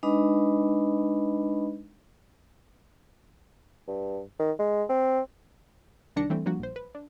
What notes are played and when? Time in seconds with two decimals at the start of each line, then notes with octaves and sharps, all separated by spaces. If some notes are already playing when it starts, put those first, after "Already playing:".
0.03 G#3 D4 D#4 B4 D#5 B5
3.88 G2
4.39 D#3
4.59 G#3
4.89 C4
6.16 C2 D#3 D4 A#6 C#7
6.30 E3 G3 A3 C4
6.46 F3 G3 A#3 D4 F#4
6.59 A#1 C5
6.76 B4
6.95 D4